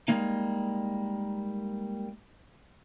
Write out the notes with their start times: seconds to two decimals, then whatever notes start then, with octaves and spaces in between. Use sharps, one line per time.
0.08 G3 G#3 A#3 D#4